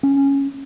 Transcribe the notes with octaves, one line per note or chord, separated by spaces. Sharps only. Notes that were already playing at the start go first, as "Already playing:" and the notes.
C#4